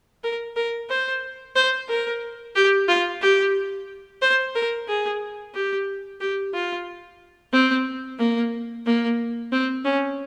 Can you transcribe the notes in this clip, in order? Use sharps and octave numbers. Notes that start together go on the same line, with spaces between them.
A#4
A#4
C5
C5
A#4
G4
F4
G4
C5
A#4
G#4
G4
G4
F4
C4
A#3
A#3
C4
C#4